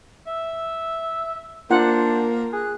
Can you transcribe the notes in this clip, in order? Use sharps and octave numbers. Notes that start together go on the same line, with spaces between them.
E5 E6
A#3 D4 F4 C5 F#5
G#4 F#6